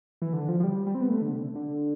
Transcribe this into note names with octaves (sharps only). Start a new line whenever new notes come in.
E3
D3
F3
F3
G3
G3
C4
B3
A3
D3
C3
D3
D3